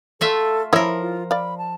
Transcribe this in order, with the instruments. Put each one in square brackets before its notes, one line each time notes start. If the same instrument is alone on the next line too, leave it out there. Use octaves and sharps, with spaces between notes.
[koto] A3 F4 E5 [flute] A4
[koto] F3 A#4 [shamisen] E4 C#5 E5 [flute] B5
[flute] F4
[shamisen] D5 F5 [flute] B5
[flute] A5